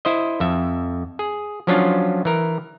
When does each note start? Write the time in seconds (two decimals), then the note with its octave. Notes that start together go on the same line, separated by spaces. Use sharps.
0.05 E4 C5 D#5
0.40 F2 E5
1.19 G#4
1.67 F3 F#3 C#4 D4 F4
2.25 E3 A#4